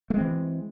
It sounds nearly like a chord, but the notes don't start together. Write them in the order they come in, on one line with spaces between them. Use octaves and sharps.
A3 G#3 C4 E3